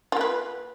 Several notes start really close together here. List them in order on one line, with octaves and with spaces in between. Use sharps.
F4 A#3 B4